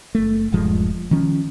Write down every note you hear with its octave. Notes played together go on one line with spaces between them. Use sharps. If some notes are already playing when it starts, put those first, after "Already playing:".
F#1 A3
D#1 G2 F3 G#3
D#3 F3 C#4